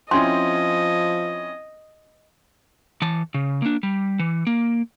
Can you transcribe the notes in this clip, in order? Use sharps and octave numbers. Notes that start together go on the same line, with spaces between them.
F3 C4 C#4 E4 D#5 C6
E3 A5
C#3
A#3 D4
G3
E3
A#3